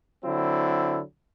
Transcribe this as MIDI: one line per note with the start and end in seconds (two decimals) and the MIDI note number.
0.24 0.99 50
0.24 0.99 54
0.24 0.99 60
0.24 0.99 64